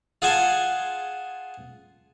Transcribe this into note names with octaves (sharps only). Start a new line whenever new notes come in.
F4 G#4 F#5 G#5 A5 C6